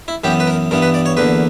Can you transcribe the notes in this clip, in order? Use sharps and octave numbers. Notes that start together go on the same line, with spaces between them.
E4
F#2 E3 B3 G4
B4
A#4
G2 E3 B3 A#4
B4
D5
C#5
E2 D3 A#3 B4